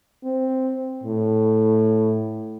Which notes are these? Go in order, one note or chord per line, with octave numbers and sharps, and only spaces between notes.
C4
A2